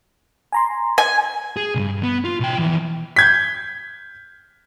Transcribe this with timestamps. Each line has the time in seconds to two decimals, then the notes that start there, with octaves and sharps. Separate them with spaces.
0.52 G#5 A#5 C6
0.98 G#5
1.57 G#4
1.75 C2 G2
2.03 B3
2.25 F4
2.40 B2 G5
2.57 F2 E3
3.16 G6 G#6 B6